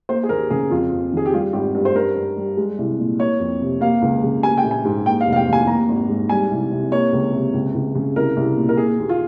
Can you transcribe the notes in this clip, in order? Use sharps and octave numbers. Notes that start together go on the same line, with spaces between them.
A#3 C5
G#4
D#2 A#4
C#3 G#4
F2 F4
F2
D#3 G#4
G4
G3 F4
G#1 G4
G2
C5
G2 A#4
G2
G3
G#3
C2
A#2
A#3 C#5
F2
C3
A#3 F5
C#2
C#3
A#3 G#5
G5
A#1
G#5
G#2
A#3 G5
F5
F1
F5
G5
D#2
G#5
A#3 A#5
G#1
G#2
G3 G#5
C2
C3
A#3 C#5
C#2
C3
C#2
C#2
C#3
C2 A#4
C2
A#2
A#4
A#3 G#4
D#2
F4